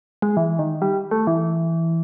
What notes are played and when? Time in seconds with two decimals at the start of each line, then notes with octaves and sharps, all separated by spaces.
0.22 G#3
0.37 E3
0.59 D#3
0.82 G3
1.11 A3
1.27 E3